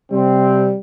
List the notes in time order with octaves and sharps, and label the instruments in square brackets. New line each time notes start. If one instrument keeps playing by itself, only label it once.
[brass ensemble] C3 C4 [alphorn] G3